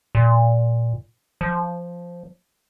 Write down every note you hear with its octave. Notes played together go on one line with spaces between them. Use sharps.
A#2
F3